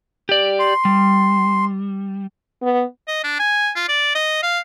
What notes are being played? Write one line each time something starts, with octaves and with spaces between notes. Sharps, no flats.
G4 D5
C6
G3
B3
D#5
D4
G#5
F4
D5
D#5
F5